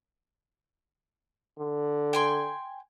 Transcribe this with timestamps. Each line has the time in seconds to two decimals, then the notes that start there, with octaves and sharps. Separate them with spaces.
1.59 D3
2.13 G5 G#5 C6